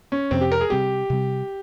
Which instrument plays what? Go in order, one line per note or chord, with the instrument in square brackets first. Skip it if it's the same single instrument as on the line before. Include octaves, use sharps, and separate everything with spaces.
[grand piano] C#4
[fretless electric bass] F2 C3 F3 [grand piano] C4
[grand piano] G4
A#4
G#4
[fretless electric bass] C3 G3 C4 [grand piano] G4
[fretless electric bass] C3 G3 C4